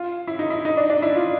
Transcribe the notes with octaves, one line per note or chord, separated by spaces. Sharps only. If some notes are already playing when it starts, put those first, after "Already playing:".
Already playing: F4
E4
D#4
E4
D#4
D4
D4
E4
F4